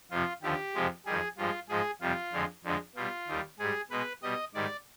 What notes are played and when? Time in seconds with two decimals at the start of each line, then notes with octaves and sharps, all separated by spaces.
0.11 F2 C3 F3 F4
0.43 D#2 D3 F3 G4
0.74 F2 C3 F3 G#3
1.06 F2 D#3 G3 G#4
1.38 G2 F3 G#3 F4
1.69 G#2 F3 G#3 G#4
2.01 F2 C3 G3 F4
2.33 F2 D3 G#3
2.64 F2 D3 G#3
2.95 B2 G3 F4
3.28 D#2 D#3 G3
3.59 G#2 G3 G#4
3.91 B2 G#3 B4
4.23 B2 G3 D#5
4.54 G#2 D#3 G3 D5